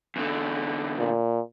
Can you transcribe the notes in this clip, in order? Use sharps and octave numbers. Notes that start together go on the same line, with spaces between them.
E2 D3
A#2